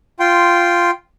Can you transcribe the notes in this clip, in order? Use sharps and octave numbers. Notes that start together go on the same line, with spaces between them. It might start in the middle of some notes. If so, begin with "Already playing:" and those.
F4 G5 C6